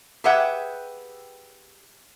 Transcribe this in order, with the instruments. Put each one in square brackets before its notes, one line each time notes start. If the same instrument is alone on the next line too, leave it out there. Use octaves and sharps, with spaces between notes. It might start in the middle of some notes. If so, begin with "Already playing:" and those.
[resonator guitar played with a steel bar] G4 G#4 B4 E5 F#5 G5